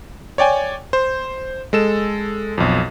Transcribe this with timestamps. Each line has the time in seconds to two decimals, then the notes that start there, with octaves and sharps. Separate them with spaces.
0.38 C#5 D5 G5 G#5
0.93 C5
1.73 G#3 A4 E7
2.58 B1 F2